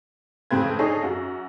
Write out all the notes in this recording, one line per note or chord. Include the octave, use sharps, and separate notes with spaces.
F2 A2 C#3 C4 B4 G#6
D4 D#4 G#4 A4 C#5
F#2 F#4